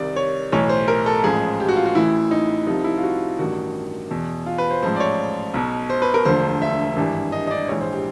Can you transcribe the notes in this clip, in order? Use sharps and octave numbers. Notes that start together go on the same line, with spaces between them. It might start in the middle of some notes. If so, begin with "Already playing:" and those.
Already playing: C2 C3 D#3 D5
C#5
B1 A2 E3 C#5
C5
A#4
A4
A1 G#2 F3 G#4
G4
F#4
F4
F#4
A1 A2 E3 E4
D#4
C2 C3 F3 D#4
E4
F4
F#4
A1 G2 D#3 F#4
E2 B2
F4
B4
C5
A1 G#2 F3 C5
D5
C#5
B1 B2
C5
B4
A#4
E1 D2 D3 F3 C5
E5
G#1 G2 E3
D#5
D#5
D5
A#1 G#2 E3 C#5
C5
G4